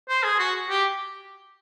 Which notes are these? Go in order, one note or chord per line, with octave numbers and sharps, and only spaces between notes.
C5
G#4
F#4
G4